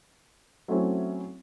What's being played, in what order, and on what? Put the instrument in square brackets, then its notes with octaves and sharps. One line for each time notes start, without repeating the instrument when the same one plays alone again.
[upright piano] F#3 A3 C4 C#4 E4